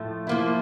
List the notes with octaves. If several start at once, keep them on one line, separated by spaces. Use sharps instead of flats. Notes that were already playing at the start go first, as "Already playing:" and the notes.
Already playing: A2 F3 A3
F3 A#3 E4